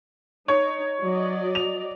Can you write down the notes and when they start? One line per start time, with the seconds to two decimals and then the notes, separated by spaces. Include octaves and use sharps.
0.48 D#4 C#5
1.03 F#3 D5 D#5
1.55 F7